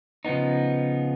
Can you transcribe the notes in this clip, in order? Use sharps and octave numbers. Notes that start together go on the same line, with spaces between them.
C#3 F3 B3 D#4